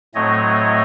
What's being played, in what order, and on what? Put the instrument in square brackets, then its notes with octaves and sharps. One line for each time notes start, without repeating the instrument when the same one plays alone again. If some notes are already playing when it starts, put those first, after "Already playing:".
[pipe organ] A2 F#3 A3 C4 C#5 D#5